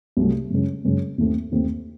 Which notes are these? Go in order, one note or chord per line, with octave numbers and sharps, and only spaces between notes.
C2 C3 F#3 A3
F#2 C#3 G#3 C#4
F#2 C#3 G#3 C#4
D#2 D#3 A3 C4
D#2 D#3 A3 C4